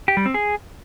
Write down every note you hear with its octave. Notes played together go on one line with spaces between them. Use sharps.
G4
G3
C4
G#4